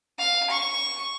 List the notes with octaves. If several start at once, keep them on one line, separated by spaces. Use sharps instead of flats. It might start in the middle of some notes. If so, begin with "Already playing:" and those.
F5
C#6